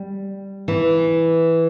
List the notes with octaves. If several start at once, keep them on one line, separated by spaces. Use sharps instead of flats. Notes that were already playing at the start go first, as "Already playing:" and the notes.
Already playing: G3
E3